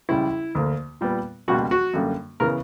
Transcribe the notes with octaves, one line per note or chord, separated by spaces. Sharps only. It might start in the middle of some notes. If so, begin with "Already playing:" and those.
C#2 C#3 G3 E4
D2 D3 A#3
A#2 G3 B3
C#2 B2 G3 A#3 F#4
F#4
F#2 D3 G3 A#3
C#3 E3 B3 A#4